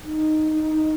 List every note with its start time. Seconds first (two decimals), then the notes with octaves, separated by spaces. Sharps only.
0.05 D#4